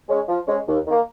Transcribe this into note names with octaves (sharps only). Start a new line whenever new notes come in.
G#3 C#4
F3
G#3 C#4
D#2
D#3 A#3